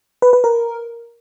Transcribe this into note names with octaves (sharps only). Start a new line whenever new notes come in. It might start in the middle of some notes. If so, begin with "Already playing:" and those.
B4
B4
A#4